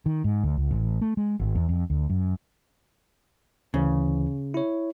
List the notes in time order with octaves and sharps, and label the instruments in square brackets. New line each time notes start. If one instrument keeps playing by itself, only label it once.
[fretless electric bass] D#3
G#2
D2
C#2
A1
A3
G#3
G#1
E2
F2
D2
F#2
[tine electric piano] D2 E3 [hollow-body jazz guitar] C#3
[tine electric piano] E4 C#5